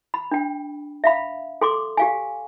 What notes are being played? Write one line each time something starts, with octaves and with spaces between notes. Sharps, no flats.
B5
D4 G5
E5 F5 B5
A4 C6 D6
G4 F5 G#5